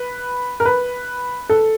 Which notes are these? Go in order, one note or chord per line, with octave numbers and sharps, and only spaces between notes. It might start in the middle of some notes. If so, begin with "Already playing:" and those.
Already playing: B4
A#4
B4
A4